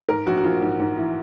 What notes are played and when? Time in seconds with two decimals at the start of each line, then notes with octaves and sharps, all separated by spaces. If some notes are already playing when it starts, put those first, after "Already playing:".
0.09 G#2 A#4
0.26 A#1 F#4
0.37 F#4
0.44 A#1 F4
0.62 G#2
0.79 G#2
0.97 E3